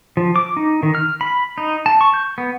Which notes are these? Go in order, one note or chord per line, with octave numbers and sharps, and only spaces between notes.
F3
D6
D#4
D#3
F6
B5
D#4
A5
C#6
G6
B3